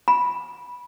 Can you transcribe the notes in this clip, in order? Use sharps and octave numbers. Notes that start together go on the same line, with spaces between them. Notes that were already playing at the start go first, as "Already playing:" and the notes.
B5